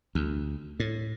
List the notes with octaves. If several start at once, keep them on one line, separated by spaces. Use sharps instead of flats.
D2
A2